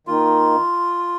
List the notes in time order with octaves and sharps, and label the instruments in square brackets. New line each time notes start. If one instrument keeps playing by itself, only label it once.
[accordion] D#3 A#3 D#4 [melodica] F4